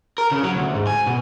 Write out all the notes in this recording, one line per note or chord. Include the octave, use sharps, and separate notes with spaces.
A#4
C#3
F#3
D2
G#2
G#5
B2